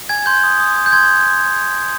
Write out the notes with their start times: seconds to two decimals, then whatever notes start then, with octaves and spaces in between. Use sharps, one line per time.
0.09 G#5 G#6
0.26 C6 G6
0.44 D#6
0.60 D#6
0.76 D#6
0.86 G6
0.92 C6 G#6